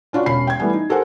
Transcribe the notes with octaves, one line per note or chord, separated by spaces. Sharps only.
C#4 D4 F4 F#4
E1 C#4 B5 C7
G5 G#6
E3 G3 A3 B3 G#5
D#4
G4 A4 A#4 C5 F#5 G#5